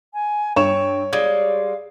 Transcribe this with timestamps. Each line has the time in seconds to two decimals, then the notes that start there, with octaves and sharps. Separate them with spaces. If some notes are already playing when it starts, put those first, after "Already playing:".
0.14 G#5
0.56 G2 C#5 G5 C#6 E7
1.13 G3 G#3 F5 G#6